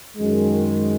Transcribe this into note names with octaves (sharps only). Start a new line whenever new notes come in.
F#2 D#3 G#3